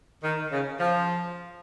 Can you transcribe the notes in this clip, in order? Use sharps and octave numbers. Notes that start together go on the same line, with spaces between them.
D#3
C#3
F3